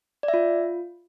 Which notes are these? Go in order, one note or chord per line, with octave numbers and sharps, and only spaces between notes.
D5
E5
F4